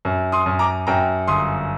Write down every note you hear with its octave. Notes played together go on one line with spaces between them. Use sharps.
F#2
C6 D#6
F#2
A#5 D6
F#2 G5 A#5
G1 C6 D#6